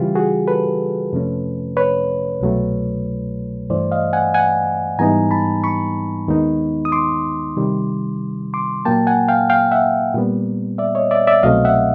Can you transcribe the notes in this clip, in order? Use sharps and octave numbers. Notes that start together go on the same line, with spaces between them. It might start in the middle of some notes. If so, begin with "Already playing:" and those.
Already playing: C#3 E3 G3 F4 G4
F#4 G#4
A4 B4
F2 C3 F3 A3 C#4
B4 C#5
C2 B2 F#3 A3
G2 E3 A3 C5 D5
D#5 F5
F#5 G#5
F#5 G#5
G#2 E3 G3 B3 D#4 G#5 A#5
A5 B5
B5 C#6
D#2 D#3 G#3 B3 D#4
D#6
C6 D6
C3 D#3 G3
C6 D6
A#2 F#3 A#3 G5 A5
F#5 G#5
F5 G5
F5 G5
E5 F#5
A#2 G3 B3
D5 E5
C#5 D#5
D5 E5
D5 E5
C2 B2 F#3 A3 C4 D#5 F5
E5 F#5